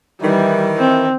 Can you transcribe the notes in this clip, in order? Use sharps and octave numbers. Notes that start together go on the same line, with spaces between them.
D#3 E3 G3
C4